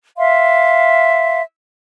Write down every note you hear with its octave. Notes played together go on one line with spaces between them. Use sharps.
E5 F5 C6